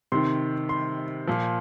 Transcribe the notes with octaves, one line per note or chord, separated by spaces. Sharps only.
C3 D#3 C6
C6
A#2 F3